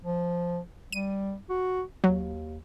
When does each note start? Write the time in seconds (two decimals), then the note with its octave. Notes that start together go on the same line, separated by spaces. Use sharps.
0.04 F3
0.92 G3 D#7
1.49 F#4
2.04 D#2 F#3